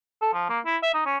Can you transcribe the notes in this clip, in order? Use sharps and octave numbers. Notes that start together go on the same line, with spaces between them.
A4
F3
A#3
E4
E5
D#4
C#4